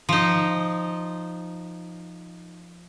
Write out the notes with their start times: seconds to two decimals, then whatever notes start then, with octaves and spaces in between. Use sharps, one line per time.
0.09 F3 D#4